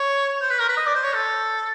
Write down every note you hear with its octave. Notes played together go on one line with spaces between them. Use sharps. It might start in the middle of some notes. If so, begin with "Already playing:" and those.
Already playing: C#5
C5
B4
A#4
B4
D#5
D5
C5
C#5
A4